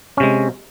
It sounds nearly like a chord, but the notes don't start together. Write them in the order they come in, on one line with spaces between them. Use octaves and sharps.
C#4 C3 G#3